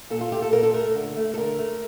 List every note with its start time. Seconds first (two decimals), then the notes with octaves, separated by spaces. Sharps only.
0.10 A#2 A4
0.21 F4
0.32 A3 G4
0.42 A4
0.53 A#2 A#4
0.63 A4
0.74 A3 A#4
0.95 D3
1.17 A3
1.34 A4
1.38 D3 A#4
1.59 A3